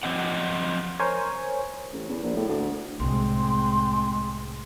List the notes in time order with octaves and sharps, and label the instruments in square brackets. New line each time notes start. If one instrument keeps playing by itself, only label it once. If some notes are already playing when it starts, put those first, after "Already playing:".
[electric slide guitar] F3 C4 D#5 F#5
[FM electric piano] A#4 C5 C#5 G#5
[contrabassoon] A1
E2
A#1
A2
D2
[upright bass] C2 A2 [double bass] G#3 C4 [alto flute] C6